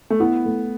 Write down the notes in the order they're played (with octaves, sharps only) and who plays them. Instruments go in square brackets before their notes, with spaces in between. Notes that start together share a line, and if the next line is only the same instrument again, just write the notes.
[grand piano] A3
[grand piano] B3 [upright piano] E4
[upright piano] A3